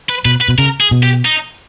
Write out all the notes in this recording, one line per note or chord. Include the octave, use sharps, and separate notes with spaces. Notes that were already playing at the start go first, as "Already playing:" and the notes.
B4
B2 B4
B4
B2
C#3 A#4
G#4
B2
G4
D#4